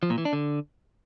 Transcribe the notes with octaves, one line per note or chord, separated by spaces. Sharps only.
F3
A#2
E3
D4
D3